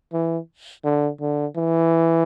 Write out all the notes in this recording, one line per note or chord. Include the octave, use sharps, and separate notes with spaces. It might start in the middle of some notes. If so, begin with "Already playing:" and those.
E3
D3
D3
E3